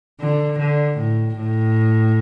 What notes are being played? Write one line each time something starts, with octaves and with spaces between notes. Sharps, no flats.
D3
D3
A2
A2